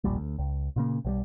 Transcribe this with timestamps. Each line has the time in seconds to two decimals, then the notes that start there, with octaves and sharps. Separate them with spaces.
0.04 E1 A#1 A#2 G3
0.17 D2
0.39 C#2
0.76 A#2 C#3 A#3
1.05 B1 F#3 G3